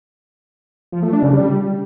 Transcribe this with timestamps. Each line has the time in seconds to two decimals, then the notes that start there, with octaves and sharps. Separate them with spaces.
0.92 F3
1.03 A3
1.13 D4
1.23 C#3
1.33 G3